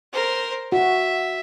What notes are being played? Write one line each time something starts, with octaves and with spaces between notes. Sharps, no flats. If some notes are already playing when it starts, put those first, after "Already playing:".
A#4 C5
F#4 E5